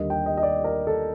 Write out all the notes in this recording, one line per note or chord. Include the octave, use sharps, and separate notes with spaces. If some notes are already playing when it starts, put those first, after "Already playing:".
Already playing: D#2 D3 G3 A#3 D#5
G5
D#5
D#5
D5
A#4
A4